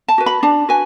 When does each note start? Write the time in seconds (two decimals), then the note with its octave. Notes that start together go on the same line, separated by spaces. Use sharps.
0.08 A5
0.18 F#4 B4
0.26 B5
0.43 D4 A5
0.69 F#4 B4 G#5